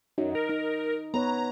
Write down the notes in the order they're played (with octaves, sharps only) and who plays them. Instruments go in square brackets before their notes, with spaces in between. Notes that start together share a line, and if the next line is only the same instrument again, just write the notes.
[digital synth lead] F#2 [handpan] D#4
[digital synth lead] A#4
[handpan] D#4
[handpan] B3 B4 C#5 [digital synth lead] A#5